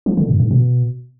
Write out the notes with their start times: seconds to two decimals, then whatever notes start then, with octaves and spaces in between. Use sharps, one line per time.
0.06 F3
0.17 D3
0.28 G2
0.40 G#2
0.51 B2